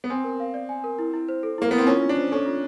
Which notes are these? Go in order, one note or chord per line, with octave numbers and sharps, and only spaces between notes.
B3
C4 G#5
A#4
F5
D5
G#5
A#4
E4
E4
C5
A4
A#3 E4
B3 E4
C4
C#4 F4
F4
D4
C5
C#4 A4
F4